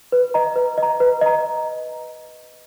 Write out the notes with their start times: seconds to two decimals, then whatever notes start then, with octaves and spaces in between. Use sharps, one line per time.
0.12 B4
0.34 D#5 A#5
0.56 B4
0.78 D#5 A#5
1.00 B4
1.21 D#5 A#5